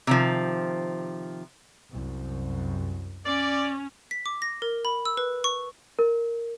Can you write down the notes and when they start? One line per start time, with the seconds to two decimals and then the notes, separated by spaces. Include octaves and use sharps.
0.07 C3 D#3 F3
1.91 C2 F#2
3.26 C#4 D5
4.11 B6
4.26 D6
4.42 A#6
4.62 A#4
4.85 B5
5.05 E6
5.17 B4
5.44 C#6
5.99 A#4